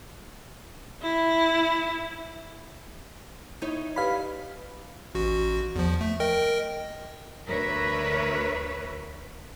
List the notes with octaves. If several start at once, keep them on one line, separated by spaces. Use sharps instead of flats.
E4
D#4 E4 C#5
G4 B4 D5 F5 B5
A1 F#4
E2 F3
A3
A#4 D#5 G5
D2 A#4 B4 C#5 E5